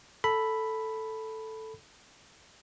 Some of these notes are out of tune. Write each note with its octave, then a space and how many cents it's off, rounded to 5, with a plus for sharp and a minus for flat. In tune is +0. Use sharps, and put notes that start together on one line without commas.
A4 +0 B5 +0